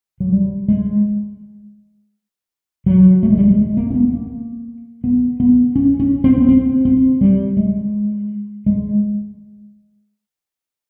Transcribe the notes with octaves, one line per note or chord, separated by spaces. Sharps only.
F#3
G3
G#3
F#3
A3
G#3
G3
G#3
G#3
A#3
C4
B3
A#3
B3
B3
C#4
C#4
C4
B3
C4
C4
G3
G#3
G#3